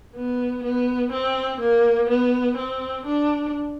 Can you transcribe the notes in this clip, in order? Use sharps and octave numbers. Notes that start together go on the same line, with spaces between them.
B3
B3
C4
A#3
B3
C4
D4